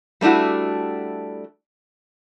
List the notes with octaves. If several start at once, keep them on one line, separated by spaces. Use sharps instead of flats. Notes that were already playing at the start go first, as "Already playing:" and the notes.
G3 A3 D4 E4 F#4